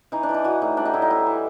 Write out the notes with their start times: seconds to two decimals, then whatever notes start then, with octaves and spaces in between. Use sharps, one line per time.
0.12 E3 D#4
0.23 D4
0.29 E3
0.34 D#4
0.44 E3 F#4
0.62 A2 D#4
0.77 G3 D4
0.85 D#4
0.94 A2 E4
1.02 D#4
1.10 E3 E4
1.27 E3